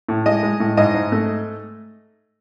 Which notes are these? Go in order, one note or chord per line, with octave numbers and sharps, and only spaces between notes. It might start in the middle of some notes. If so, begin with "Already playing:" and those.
A2
G#3 D#5
G#3
A2
G#2 D#5
G#2
A3